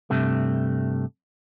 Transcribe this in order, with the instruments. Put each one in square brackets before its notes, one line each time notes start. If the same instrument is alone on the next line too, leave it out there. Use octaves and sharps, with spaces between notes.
[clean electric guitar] G2 C3 A3